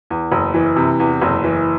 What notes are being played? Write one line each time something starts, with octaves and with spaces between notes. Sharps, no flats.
E2
F#1
E3
C3
E2
F#1
E3